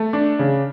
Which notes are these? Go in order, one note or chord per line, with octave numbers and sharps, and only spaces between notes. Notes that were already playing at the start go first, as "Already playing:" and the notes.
Already playing: A3
D4
C#3